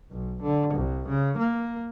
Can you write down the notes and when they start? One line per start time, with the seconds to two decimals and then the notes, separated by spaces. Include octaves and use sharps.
0.11 B1
0.42 D3
0.74 C2
1.09 C#3
1.38 A#3